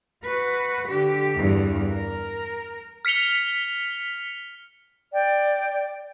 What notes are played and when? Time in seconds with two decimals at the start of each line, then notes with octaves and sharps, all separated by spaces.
0.25 F#4 B4
0.89 D3 G4
1.36 E2 G2
1.92 A#4
3.05 F6 B6 C#7 F7 G7
5.13 D5 G5